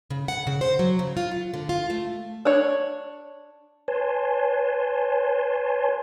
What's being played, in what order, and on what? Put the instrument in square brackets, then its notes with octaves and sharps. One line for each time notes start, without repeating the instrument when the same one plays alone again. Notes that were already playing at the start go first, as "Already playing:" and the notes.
[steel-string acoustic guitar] C#3
F#5
C#3
C5
F#3
C#3
F4
F#3
D3
F4
A3
[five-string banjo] D4 C#5
[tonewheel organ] B4 C#5 G#5 A5 C6